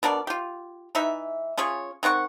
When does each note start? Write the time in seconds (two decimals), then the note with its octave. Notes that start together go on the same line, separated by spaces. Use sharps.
0.03 B2 D4 A#4 D5
0.27 F4 G4
0.95 E3 D#4 E5
1.58 C#4 F4 G#4 C#5
2.03 D#3 C4 F#5 C#6